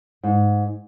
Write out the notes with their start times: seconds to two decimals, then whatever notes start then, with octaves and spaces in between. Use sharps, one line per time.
0.23 G#2